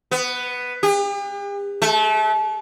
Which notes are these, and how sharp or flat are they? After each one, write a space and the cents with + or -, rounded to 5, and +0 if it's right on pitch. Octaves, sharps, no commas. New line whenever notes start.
B3 +5
G4 +45
A3 -35